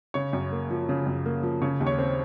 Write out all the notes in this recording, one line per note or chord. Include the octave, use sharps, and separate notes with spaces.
C#3 C#5
F#2
A#3
F3
C#3
F#2
A#3
F3
C#3 C#5
D#2
C#5
C4